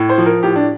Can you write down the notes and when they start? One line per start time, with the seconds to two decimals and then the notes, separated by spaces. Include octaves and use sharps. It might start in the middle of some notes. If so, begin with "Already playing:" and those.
Already playing: A2
0.09 C5
0.18 F3
0.26 A#4
0.43 A2 G4
0.56 D4